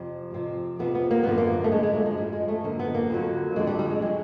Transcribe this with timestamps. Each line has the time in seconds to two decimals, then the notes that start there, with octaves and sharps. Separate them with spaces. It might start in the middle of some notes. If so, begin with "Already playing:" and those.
Already playing: F2 C3 F3
0.34 F2 C3 F3 C4
0.79 F2 C3 F3 B3
0.95 B3
1.11 A#3
1.23 F#2 D3 F3 B3
1.38 A#3
1.64 A3
1.72 F#2 D3 F3 G#3
1.83 G#3
1.95 A3
2.06 G#3
2.17 F#2 D3 F3 G3
2.33 G#3
2.48 A3
2.64 F#2 D3 F3 A#3
2.79 B3
2.94 A#3
3.10 F2 D3 F#3
3.56 F2 D3 F#3 G#3
3.67 G3
3.79 G3
3.90 G#3
4.02 D3 F#3 G#3